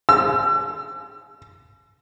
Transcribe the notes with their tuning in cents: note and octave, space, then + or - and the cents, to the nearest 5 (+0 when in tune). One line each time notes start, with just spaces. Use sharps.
E6 +40